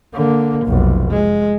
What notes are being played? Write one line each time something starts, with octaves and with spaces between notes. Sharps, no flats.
D3 A#3
F1 B1
G#3